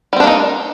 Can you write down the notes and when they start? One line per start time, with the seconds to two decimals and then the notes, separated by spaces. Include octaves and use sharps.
0.13 G3
0.16 C4
0.20 D4
0.24 A#3
0.27 D#4